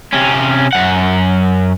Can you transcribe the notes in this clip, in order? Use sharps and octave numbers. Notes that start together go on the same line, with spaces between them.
C3 C#4
F#2 F#5